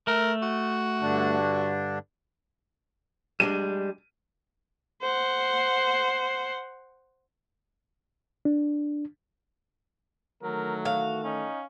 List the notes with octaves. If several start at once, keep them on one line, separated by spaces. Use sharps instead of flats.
A3 A#4
F#4
G2 D3 D4
G3 G#3 D4 D#7
C5 F#5
D4
D#3 E3 F#3 A3 A#4
F#4 F5
C#4 D#4